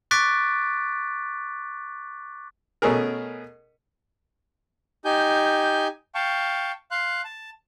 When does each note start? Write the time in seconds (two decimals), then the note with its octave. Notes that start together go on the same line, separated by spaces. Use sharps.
0.11 C#6 D6 F#6 A6 B6 D7
2.82 B2 A3 C#4 G#4 A#4
5.05 D#4 G4 G#5 G6
6.15 F5 G5 A5 C#6
6.91 F5 C6 F#6
7.24 A5